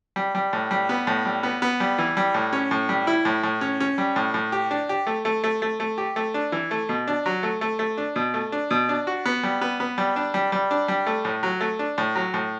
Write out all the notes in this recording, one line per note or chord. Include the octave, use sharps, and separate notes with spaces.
G3
G3
A2
G3
B3
A2
G3
B3
B3
G3
E3
G3
A2
C#4
A2
G3
E4
A2
A2
C#4
C#4
G3
A2
A2
G4
D4
G4
A3
A3
A3
A3
A3
G4
A3
D4
E3
A3
B2
D4
F#3
A3
A3
A3
D4
B2
A3
D4
B2
D4
F#4
B3
G3
B3
B3
G3
D4
G3
G3
D4
G3
A3
A2
F#3
A3
D4
A2
F#3
A2